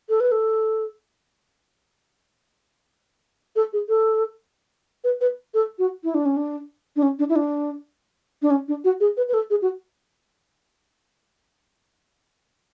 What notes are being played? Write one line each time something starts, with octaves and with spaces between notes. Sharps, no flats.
A4
B4
A4
A4
G#4
A4
B4
B4
A4
F#4
E4
D4
C#4
D4
D4
C#4
D4
E4
D4
D4
C#4
D4
F#4
G#4
B4
B4
A4
G#4
F#4